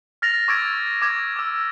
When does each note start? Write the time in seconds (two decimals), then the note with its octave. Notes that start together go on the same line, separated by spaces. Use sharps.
0.22 F6 A6 A#6 F7
0.48 C#6 D6 E6 G#6 A6 D7
1.02 D6 G#6
1.36 D6 E6